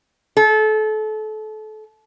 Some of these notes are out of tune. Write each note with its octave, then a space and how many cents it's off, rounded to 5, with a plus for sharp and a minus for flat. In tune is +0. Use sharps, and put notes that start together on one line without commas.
A4 -30